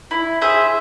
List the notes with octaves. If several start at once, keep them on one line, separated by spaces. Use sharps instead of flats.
E4
G#4 C5 E5